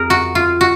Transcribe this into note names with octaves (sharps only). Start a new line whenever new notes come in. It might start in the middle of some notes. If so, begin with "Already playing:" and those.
Already playing: F2 G#4 A#4
F#4
F4
F#4